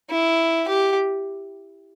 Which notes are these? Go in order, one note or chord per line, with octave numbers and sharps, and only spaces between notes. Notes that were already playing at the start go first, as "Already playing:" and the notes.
E4
G4